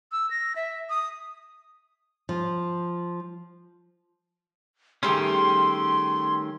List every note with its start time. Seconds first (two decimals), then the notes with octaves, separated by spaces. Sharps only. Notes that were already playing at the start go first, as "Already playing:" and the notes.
0.12 E6
0.30 A#6
0.56 E5
0.90 D#6
2.29 F3
5.03 D#3 G3 A3 C#4 G4 G#4 C6